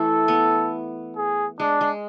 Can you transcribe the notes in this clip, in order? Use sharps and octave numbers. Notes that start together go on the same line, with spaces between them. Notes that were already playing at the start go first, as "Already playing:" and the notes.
Already playing: E3 A3 A4
B3
G#4
G#3 D4
G#3